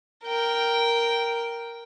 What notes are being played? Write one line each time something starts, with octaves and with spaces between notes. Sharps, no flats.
A#4 G5